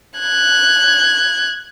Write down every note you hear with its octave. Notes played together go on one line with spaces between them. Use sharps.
F#6 G#6